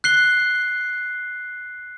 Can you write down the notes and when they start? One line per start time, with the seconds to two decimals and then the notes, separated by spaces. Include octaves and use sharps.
0.04 F#6 C7 G7